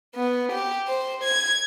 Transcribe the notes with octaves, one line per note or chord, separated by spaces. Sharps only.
B3
G4
C5
G#6